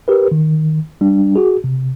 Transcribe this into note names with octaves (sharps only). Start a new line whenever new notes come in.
G4 A#4 B4
D#3
G3 D4
F#4 G#4
C3